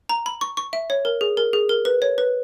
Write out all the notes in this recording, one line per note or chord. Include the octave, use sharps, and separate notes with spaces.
A#5
B5
C#6
C#6
E5
C#5
A#4
G#4
A#4
G#4
A#4
B4
C#5
B4